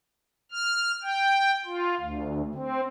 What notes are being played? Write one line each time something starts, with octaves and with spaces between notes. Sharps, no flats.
F6
G5
F4
D2
C4